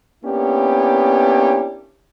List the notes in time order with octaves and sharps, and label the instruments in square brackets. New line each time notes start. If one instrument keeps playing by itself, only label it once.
[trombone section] A#3 B3 C#4 D4 E4 G4